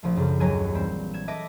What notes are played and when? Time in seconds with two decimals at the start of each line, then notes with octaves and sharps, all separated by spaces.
0.03 A#1 F3 A3
0.16 F#2 C#3
0.40 D#2 F#3 D#4 G#5 G#6 D#7
0.73 E3 G3 C4
1.14 G#6 E7
1.28 B4 D#5 E5 A5 D6 A#6